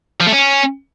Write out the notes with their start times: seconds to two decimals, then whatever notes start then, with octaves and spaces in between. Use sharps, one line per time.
0.20 F3
0.26 A3
0.33 C#4